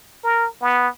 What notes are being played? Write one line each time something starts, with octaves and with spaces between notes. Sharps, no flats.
A#4
B3